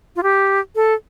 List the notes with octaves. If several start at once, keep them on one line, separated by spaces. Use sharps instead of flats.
F4
G4
A4